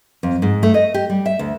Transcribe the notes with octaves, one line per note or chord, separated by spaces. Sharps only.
F2
G#2
A3
D#5
G4
G3
E5
D2